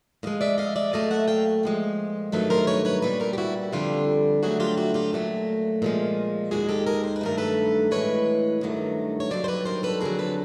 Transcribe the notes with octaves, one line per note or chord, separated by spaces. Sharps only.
A2 F3 G#3 D#5 F5
D5 E5
D#5 F5
D5 E5
A#2 F#3 A3 D#5 F5
E5 F#5
F5 G5
A#2 F3 G#3
G2 D#3 F#3 A3 A4 B4
A#4 C5
B4 C#5
B4 C#5
A#2 G3 B4 C#5
A#4 C5
G4
E4 F#4
F2 D3 G3 F4 G4
D2 D3 F#3 A3 F#4 G#4
F4 G4
E4 F#4
F4 G4
A#2 F#3 A3
A#2 F3 G#3
D#2 D#3 G#3 F#4 G#4
G4 A4
G#4 A#4
C5
B4
G2 D#3 F#3 A3 A#4
A4 B4
A2 E3 G#3 B4 C#5
G2 D#3 F#3 A3
C#5
G2 D#3 F#3 C5 D5
C5
B4 C#5
A#4 C5
A4 B4
F2 D3 F#3 G#4 A#4
A4 B4